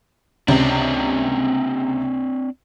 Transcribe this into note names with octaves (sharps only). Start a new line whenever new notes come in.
C#2 C3 C4 D4